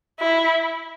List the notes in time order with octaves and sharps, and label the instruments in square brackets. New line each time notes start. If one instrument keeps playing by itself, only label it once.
[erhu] E4